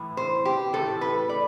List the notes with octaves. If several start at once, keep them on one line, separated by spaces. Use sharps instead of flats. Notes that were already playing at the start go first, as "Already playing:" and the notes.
Already playing: A2 E3
C5
G4
A2 E3 A3 A4
B4
D5